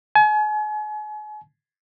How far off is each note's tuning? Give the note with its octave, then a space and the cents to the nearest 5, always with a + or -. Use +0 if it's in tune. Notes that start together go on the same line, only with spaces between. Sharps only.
G#5 +40